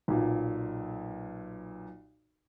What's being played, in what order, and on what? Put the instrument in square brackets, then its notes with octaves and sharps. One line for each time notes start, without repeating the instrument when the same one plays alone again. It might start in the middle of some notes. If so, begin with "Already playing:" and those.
[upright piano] B1 A#2